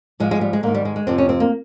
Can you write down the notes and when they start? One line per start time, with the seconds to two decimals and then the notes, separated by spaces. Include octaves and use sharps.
0.20 G#2 F3 G#3
0.31 G#3
0.41 G3
0.53 G#3
0.63 G#2 D#3 A#3
0.74 G3
0.85 G#3
0.96 G#3
1.07 F2 C3 F3 C4
1.18 C#4
1.29 C4
1.40 A#3